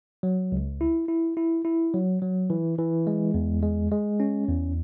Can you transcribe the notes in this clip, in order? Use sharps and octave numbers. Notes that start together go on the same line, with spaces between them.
F#3
C#2
E4
E4
E4
E4
F#3
F#3
E3
E3
G#3
E2
G#3
G#3
C#4
E2